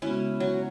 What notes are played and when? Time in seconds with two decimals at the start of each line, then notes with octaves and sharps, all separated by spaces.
0.02 C#3 G#3 B3 C#4 E4 F#4
0.40 F#3